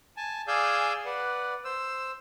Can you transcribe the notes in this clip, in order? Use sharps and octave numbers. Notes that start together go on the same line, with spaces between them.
G#5 A5
G#4 D5 F5 G#5 E6 G6
B4 D5 F#5
C5 E6